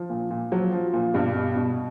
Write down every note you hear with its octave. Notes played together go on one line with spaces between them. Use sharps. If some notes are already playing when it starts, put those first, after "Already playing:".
Already playing: F3
A#2
A#2
F3 F#3
F3
A#2
G2 B2 G3
B2
B2